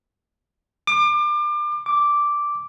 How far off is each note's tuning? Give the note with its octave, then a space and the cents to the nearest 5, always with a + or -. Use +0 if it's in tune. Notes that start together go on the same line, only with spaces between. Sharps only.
D6 +30
D6 -5